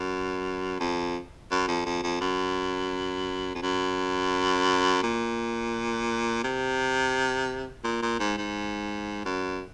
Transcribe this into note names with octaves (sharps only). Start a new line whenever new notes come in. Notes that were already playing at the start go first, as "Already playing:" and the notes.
Already playing: F#2
F2
F#2
F2
F2
F2
F#2
F2
F#2
A#2
C3
A#2
A#2
G#2
G#2
F#2